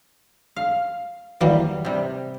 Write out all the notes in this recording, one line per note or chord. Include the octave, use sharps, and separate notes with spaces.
F5
E3 F#3 G3 A#3
C3 G3